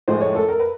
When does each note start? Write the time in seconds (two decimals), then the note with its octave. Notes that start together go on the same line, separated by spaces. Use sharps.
0.08 A2 F3 G#3 C5
0.21 C#5
0.35 A4
0.48 A#4
0.60 B4